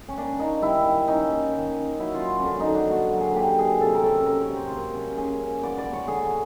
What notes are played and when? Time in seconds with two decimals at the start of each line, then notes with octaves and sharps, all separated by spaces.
0.09 C#4
0.17 A#3 D4
0.39 A#3 D#4
0.62 G3 E4
0.85 D#3
1.08 C#4 D#4
1.31 A#3
1.53 D#3
1.76 C#4
1.99 F#3 E4
2.14 F4
2.21 F#3
2.30 F#4
2.40 D3 C#4 D4
2.60 D#4
2.68 D3
2.75 D4
2.90 A#3 F#4
3.13 F#3
3.20 G#4
3.36 A#3 G4
3.58 F#3 G#4
3.81 C3 A4
3.94 A#4
4.03 C#4 A4
4.26 C#4 A#4
4.41 C#5
4.49 C3
4.57 C5
4.71 A#3
4.94 C#4
5.18 C#4 G#4
5.40 A#3
5.63 B3 D5
5.78 D5
5.85 B3
5.93 C#5
6.08 D3 G#4